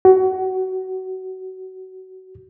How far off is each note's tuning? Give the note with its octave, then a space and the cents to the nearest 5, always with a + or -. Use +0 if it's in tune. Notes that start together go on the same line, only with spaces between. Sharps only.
F#4 +25